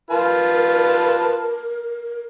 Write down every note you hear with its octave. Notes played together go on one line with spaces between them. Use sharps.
F4 A#4 B4 A5